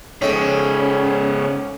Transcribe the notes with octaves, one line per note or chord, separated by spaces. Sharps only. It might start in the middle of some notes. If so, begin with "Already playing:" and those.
G#2 C#3 C#4 A4 C#5 D#5 G5